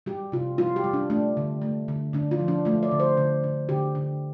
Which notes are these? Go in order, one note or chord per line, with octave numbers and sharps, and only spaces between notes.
G3 G4
C3 F4
G3 F4
G4
G3
D4
A3 D4
D3
A3
D3
D3 D4
F4
F3
D4
A3 F4
D5
D3
C5
D3
D3
D3 G4
D3